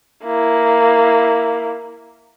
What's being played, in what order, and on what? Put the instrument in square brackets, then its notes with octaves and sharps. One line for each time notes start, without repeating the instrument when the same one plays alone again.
[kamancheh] A#3 E4